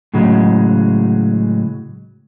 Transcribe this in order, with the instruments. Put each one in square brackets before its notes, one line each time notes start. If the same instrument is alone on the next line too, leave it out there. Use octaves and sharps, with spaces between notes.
[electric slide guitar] A2 C#3 F#3 G#3